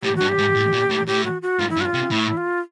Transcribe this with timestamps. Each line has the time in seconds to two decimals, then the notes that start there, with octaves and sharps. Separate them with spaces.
0.03 A2 G4
0.16 G2 F#4
0.29 G4
0.39 G#2
0.56 A2
0.73 A#2
0.90 A2
1.07 A2 G4
1.25 F#4
1.42 F#4
1.59 G#2 F4
1.70 E4
1.77 G2
1.81 F#4
1.85 F4
1.94 C3
2.11 A2 E4
2.37 F4